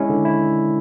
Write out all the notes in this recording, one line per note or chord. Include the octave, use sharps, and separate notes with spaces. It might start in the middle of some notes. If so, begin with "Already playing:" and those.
Already playing: G#3 C#4 E4
D3
E4